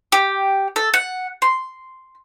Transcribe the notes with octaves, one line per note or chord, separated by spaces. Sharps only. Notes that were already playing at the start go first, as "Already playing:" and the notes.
G4
A4
F#5
C6